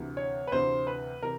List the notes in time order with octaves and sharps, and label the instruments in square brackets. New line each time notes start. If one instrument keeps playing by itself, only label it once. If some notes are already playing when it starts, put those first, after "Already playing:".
Already playing: [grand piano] D2 C3 E3
C#5
B4
D2 C3 E3 C5
B4
C3 E3 A#4